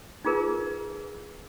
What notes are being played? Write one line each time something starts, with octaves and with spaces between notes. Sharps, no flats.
D#4 F4 G#4 A#4 B4